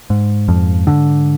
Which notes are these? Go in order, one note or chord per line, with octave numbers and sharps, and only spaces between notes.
G#2
F2 F3
D3